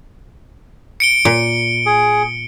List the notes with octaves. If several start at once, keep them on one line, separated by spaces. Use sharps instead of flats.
C#7 D7 G7
A#2
G#4